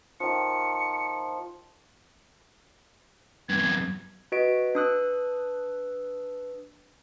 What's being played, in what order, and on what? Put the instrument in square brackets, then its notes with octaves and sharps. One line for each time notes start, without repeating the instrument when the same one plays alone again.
[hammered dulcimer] D#3 F3 [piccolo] C#7
[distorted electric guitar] E2 G2 [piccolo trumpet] G#6
[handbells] F#4 B4 D#5 D7
D4 B4 D#6 E6 F#6